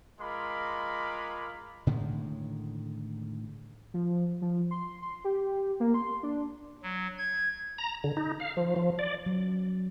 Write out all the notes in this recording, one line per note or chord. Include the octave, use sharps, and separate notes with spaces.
G#3 F4 A#4 B5 C6 D6
A2 D3 D#3 G#3
F3
F3
C6
C6
G4
A#3
C6
D4
F#3
G#6
A#5
D3
D#4
F5
F3
F3
D5
F#3